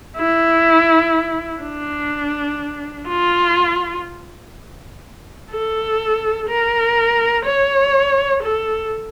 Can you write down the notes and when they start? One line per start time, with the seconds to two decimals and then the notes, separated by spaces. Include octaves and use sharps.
0.17 E4
1.62 D4
3.08 F4
5.52 A4
6.49 A#4
7.46 C#5
8.43 A4